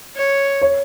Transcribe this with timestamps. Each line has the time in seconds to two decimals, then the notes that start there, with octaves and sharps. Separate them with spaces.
0.16 C#5
0.62 C#5